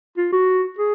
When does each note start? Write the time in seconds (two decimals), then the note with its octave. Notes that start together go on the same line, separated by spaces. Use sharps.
0.17 F4
0.32 F#4
0.79 G#4